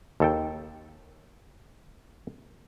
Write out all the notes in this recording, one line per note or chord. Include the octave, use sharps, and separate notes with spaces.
D#2 A4 G5